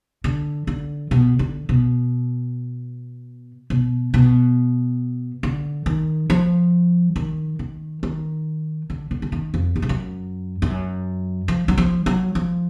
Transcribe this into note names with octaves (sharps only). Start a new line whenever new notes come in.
D3
D3
B2
D3
B2
B2
B2
D3
D#3
F3
D#3
D#3
D#3
D3
D3
D3
D#3
F2
F#2
G#2
F#2
F#2
F3
F#3
F3
F#3
F3